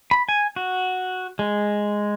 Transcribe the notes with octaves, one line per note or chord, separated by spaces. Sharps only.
B5
G#5
F#4
G#3